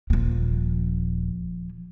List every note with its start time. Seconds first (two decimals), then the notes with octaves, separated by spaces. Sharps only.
0.10 D#1 F3 A#3